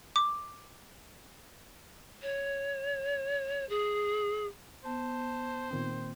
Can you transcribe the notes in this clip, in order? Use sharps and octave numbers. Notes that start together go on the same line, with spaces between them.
D6
C#5
G#4
B3 C5 A5
A#2 D#3 C4